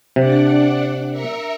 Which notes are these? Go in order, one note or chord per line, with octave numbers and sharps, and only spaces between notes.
C3 D4 D5 F#5
A#4 E5 C#7